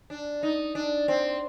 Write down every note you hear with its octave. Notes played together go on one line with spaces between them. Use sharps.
D4
D#4
D4
C4